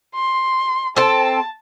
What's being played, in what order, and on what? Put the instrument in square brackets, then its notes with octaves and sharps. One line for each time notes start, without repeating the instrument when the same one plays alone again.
[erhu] C6
[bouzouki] C4 A4 [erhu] A5